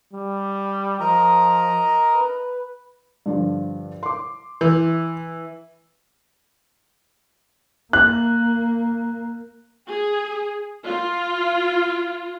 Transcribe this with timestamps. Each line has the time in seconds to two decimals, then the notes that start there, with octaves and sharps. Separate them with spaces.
0.13 G3
1.00 F3 A#4 D#5 A#5
2.14 B4
3.26 G2 D3 F3
4.03 C6 D6
4.61 E3
7.93 A#3 F#6
9.87 G#4
10.84 F4